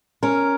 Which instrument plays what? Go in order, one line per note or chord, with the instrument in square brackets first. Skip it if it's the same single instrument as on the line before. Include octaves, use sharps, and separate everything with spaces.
[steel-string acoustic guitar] C#4 A#4